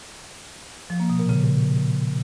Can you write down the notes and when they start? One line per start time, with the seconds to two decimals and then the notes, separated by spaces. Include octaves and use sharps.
0.90 F3
1.00 A#3
1.10 B2
1.19 A#2
1.29 C#3